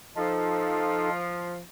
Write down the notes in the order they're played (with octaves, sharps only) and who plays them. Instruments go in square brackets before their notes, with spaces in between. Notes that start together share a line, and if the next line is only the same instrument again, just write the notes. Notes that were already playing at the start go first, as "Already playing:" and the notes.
[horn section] F3 [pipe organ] D#4 A4